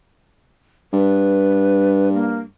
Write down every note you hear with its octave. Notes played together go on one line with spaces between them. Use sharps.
G2 B4
A#3